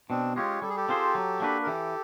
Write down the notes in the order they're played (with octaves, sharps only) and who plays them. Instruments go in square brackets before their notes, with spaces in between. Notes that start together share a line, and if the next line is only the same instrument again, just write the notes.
[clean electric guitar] B2 [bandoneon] C4 D4
[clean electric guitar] G#3 C#4 [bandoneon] F4 G4
[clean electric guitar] G3 [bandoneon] A4
[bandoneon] G#4
G4 A4
[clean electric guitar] C4 F4 G#4 C5
F#3
A#3 D4 F#4 B4
[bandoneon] A#4
[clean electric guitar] E3 [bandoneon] G4 A4